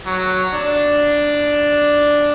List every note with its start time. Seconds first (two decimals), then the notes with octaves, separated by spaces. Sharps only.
0.06 F#3
0.54 D4